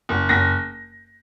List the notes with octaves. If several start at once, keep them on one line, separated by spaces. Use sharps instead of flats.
F#1
F#1 A#6